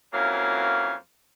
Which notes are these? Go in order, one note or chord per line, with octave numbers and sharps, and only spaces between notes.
F2 E3 F#3 A#3 C#4 F5